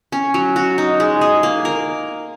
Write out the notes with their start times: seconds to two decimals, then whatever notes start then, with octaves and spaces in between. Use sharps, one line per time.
0.12 C#4
0.34 F#3
0.56 F#4
0.78 D#4
1.00 G#3
1.21 G#4
1.43 A#3
1.65 A#4